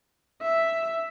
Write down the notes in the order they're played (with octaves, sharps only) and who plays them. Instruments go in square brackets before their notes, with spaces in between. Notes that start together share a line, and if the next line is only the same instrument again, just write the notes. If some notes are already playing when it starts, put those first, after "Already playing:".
[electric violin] E5